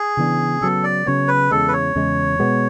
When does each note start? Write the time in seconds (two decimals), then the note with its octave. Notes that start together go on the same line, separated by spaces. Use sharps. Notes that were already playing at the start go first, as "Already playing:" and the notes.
Already playing: G#4
0.17 C#3 E3 B3 D4
0.61 C#3 F#3 B3 A4
0.84 D5
1.06 C#3 F#3 B3 C#5
1.28 B4
1.51 E2 C#3 G#3 A4
1.68 B4
1.73 C#5
1.95 E2 C#3 G#3
2.39 B2 G#3 B3